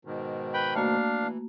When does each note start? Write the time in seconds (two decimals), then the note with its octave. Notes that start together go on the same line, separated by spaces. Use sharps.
0.05 G#2 B2 D#3
0.54 B4 G5 B5
0.75 A3 A#3 D4 F#4 F5
1.20 E3